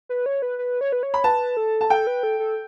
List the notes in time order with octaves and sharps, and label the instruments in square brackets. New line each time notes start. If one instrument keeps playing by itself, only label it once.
[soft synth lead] B4
C#5
B4
B4
C#5
B4
C#5
[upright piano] B5
[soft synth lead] B4 [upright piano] A5
[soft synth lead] A4
[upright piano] A5
[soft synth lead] A4 [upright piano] G5
[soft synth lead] B4
A4
A4